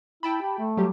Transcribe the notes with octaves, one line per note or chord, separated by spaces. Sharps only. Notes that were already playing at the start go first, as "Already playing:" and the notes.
E4 G5 A5 B5
G4
A3
F#3 G3 G4